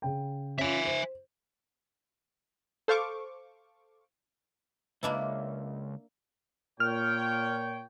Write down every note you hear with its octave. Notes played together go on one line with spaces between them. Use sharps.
C#3 G5
C#4 F4 E5 G#5
C5
A4 C5 F5 C#6 D6
C#2 A#3 D4 E4 B4 D#5
A#2 C#5 G5 F6